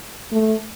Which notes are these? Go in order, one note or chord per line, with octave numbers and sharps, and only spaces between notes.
A3